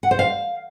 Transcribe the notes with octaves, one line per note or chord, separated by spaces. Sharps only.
F#5
C5
F5